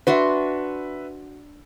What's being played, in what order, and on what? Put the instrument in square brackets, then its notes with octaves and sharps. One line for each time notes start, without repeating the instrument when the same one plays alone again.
[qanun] D4 F#4 C6 [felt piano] B4 E5